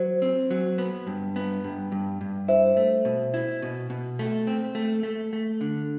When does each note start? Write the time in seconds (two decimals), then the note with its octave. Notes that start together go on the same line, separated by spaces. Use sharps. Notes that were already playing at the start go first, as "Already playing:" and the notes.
Already playing: F#3 C5
0.22 C4
0.51 F#3
0.78 B3
1.07 G2
1.36 B3
1.64 G2
1.92 G2
2.21 G2
2.48 E4 C5 E5
2.77 A3
3.05 B2
3.34 E4
3.62 B2
3.90 B2
4.19 A3
4.47 C4
4.75 A3
5.03 A3
5.33 A3
5.61 D3